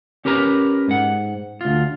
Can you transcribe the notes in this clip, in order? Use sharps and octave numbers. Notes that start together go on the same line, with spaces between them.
C#4 G4 A#4 B4 A#5
G#2 F#5
D2 F4